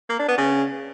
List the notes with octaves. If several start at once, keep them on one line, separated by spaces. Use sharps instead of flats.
A#3
D4
B3
C#3